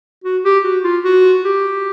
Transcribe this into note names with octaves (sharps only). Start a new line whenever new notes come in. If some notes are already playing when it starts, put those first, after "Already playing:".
F#4
G4
F#4
F4
F#4
G4